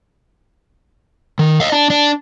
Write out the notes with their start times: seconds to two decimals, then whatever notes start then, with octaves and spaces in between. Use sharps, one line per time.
1.39 D#3
1.60 D#5 F5
1.72 D4
1.90 D4